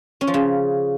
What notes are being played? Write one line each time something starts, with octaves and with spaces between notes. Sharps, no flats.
C#4
F3
C#3